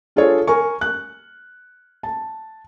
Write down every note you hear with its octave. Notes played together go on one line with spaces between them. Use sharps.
D4 F4 G#4 A4 C#5
A#4 G#5 C#6
F#6
A5